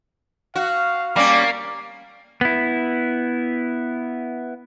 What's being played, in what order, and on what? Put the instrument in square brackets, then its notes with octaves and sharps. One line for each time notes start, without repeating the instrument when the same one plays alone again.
[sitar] F#4 [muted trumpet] F5
[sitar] G3 C#4 [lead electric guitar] A#3 [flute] D6
[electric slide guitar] B3 E4